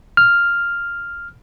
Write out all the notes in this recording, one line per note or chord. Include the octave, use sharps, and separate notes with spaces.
F6